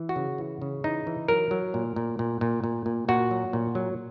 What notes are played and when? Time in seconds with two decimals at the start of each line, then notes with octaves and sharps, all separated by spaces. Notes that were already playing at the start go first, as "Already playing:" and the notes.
Already playing: E3
0.09 F#4
0.16 C#3
0.38 E3
0.62 C#3
0.84 E3 D#4
1.07 E3
1.28 F#3 A#4
1.51 F#3
1.74 A#2
1.96 A#2
2.19 A#2
2.41 A#2
2.64 A#2
2.86 A#2
3.08 A#2 F#4
3.31 F#3
3.53 A#2
3.75 F#3